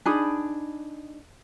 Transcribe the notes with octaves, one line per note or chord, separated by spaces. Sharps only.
D4 D#4 G#4 B5